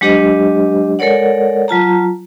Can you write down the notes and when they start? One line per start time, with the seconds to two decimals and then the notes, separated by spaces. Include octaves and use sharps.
0.01 F#3 G#3 D4 G4 C5 D#5
0.99 G#3 A4 A#4 C#5 D5 F#5
1.68 F#3 F4 A5 A#5